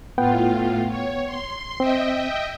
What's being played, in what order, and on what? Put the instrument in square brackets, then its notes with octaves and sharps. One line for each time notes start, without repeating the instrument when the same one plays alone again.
[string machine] A2 F4 [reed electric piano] B3 F#5 G5
[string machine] C#5
C6
[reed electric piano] C4 [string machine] D#5 E5 G5